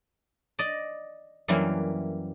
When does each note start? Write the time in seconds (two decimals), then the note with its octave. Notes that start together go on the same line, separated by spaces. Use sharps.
0.59 D5 D#5
1.48 F#2 E3 F#3 G3 A#3 E4